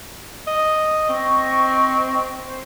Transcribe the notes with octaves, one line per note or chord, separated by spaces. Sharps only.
D#5
C4 D#5 C#6
C5